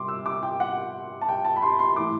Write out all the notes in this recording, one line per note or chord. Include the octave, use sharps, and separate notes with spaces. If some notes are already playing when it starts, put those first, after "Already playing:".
Already playing: C3 G3 C6 D6
E6
D6
G5
F#5
A5
G5
A5
B5
C6
C6
E3 A3 E4 D6